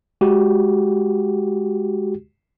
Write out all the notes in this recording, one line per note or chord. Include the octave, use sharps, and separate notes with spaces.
G#3 F#4 G4